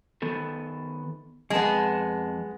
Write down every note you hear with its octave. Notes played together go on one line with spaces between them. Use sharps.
D#3 B3 A4
F2 G#3 B3 A5